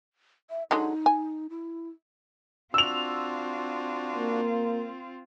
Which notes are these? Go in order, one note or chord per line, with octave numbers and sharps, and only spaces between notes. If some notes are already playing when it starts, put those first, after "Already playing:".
E5
D3 F#3 G#3 D#4
G#5
E4
C4 D4 F4 F#4 E6 F7
A#3